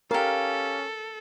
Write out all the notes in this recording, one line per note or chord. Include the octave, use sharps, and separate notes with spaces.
C#4 G4 A4 A#4 F5